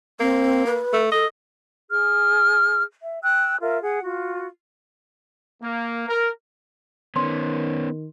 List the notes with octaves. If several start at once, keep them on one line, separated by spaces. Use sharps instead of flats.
A#3 C4
B4
A3
A4 D#5
G#4 F6
E5
G5 E6 F#6
F4 A#4 E5
G#4 F#5
F4 F#4
A#3
A#4
D#3 B3 C#4 C6